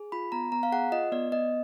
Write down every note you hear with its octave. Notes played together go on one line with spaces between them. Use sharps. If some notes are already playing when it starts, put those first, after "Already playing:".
Already playing: G#4
F4 B5
B3 A#5
B3 A#5
F5
G#4 F#5
F4 D#5
B3 D5
B3 D#5